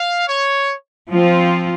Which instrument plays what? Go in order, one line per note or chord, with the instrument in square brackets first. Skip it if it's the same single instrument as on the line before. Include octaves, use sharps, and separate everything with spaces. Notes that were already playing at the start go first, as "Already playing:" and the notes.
Already playing: [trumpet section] F5
C#5
[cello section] F3 C4 F4